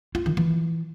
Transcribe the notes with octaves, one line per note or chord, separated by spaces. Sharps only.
F4
D#3
E3